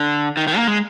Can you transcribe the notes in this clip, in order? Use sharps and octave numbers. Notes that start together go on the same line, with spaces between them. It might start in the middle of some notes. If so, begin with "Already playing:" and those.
Already playing: D3
D#3
D#3
A#3
G#3